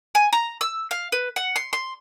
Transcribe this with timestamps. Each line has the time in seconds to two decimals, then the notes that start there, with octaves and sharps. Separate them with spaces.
0.15 G#5
0.33 A#5
0.61 E6
0.91 F5
1.12 B4
1.36 F#5
1.56 C6
1.73 C6